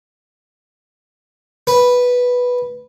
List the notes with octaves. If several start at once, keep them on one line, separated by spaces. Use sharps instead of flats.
B4